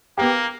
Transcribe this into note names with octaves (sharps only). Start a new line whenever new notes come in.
A#3 B3 G4